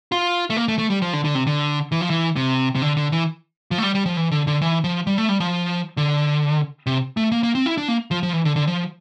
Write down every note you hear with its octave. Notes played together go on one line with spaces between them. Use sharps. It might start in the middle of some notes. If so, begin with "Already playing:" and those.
F4
A3
A#3
A3
A3
G3
F3
D3
D3
C3
D3
E3
F3
E3
C3
C3
D3
D3
E3
F3
A3
G3
G3
F3
E3
D3
D3
E3
F3
G3
A3
G3
F3
D3
C3
A3
A#3
A#3
C4
E4
D4
A#3
F3
F3
E3
D3
D3
F3